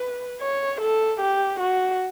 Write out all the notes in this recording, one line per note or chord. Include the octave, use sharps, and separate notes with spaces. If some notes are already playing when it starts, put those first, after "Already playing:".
Already playing: B4
C#5
A4
G4
F#4